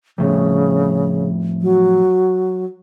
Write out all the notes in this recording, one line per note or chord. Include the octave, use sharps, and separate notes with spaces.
F2 A2 C#3
F#3